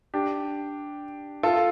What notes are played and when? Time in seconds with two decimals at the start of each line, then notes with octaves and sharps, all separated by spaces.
0.14 D4 G4
1.43 F4 A4